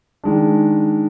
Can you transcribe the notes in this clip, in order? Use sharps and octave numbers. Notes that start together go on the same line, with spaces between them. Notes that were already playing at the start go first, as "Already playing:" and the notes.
D#3 G#3 D4